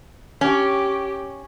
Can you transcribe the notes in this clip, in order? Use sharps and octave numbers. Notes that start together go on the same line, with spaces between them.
C#4 G4